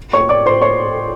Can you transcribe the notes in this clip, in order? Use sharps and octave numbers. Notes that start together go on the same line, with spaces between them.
C#5 C#6
D5 D6
C5 C6
C#5 C#6